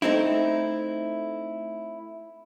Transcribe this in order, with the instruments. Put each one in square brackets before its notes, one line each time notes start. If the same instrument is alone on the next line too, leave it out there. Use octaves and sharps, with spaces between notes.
[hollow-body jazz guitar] A3 C4 D#4 E4